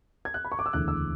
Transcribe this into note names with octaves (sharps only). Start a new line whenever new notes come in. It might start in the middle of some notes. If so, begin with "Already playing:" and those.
G#6
F#6
B5
C#6
D6
E6
E1 D2 C#3 E3 F#6
E6